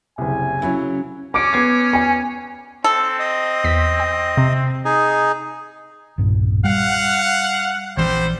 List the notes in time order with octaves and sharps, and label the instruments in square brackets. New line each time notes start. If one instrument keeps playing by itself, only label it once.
[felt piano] F#1 C2 [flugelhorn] G#5
[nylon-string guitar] C#3 F#3 C#4 [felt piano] E4
[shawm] C#4 [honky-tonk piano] D6 D7
[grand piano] B3 G#6 C7
[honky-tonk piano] G#5
[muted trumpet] C4 [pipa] A4
[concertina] D#5
[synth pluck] E2 B6
G5
C3
[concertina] D#4 G#4
[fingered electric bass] B1 G2 A#2
[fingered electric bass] G3 [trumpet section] F5 F#5
[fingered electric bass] A#1 E3 [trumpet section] G3 C4 C5